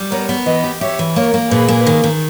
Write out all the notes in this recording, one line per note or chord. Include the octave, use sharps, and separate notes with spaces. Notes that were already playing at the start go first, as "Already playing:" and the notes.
Already playing: G3
B3 A#4 C#5
B3
E3 B4 D#5
G4
G4 C#5 E5
E3
A#3 A#4 C#5
A#3
A#2 G#4 B4
A#3
D#3
D#3